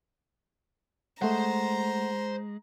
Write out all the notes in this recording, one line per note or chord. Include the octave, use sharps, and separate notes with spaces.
G#3 A3 C5 F#5 A#5 C6